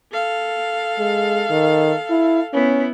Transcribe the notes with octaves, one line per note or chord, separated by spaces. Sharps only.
A4 F5
G#3
D#3
E4
B3 C#4 E4